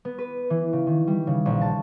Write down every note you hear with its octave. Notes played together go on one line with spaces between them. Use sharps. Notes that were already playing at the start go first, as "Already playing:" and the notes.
B3
B4
E3
C#3
D#3
G3
C#3
A#1
A5